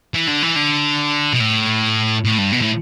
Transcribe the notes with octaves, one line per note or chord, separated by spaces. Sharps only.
E3
D3
E3
D3
B2
A2
A2
G2
B2
A2